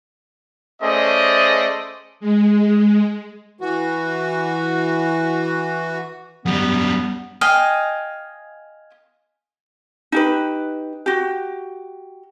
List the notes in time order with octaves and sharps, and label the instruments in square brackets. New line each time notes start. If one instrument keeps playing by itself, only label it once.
[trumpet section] A3 C#4 G#4 C5 D5 D#5
[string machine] G#3
[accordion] E3 F#4
[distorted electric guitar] F#2 G3 [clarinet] B3
[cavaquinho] D#5 F5 G5 G#5
[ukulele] D#4 G4 B4
F#4 G4